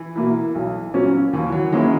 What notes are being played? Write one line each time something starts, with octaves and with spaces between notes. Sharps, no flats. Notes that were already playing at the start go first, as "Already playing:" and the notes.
Already playing: E3
B2 A#3 E4
B1
A#2 F#3 A#3 C#4
D#2 E3
F#3
D#3 G#3 A#3 C#4 E4